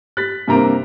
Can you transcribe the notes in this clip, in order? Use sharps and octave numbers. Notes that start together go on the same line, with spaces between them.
F#6 A6 B6
G2 C3 A#3 C5 A#5 D7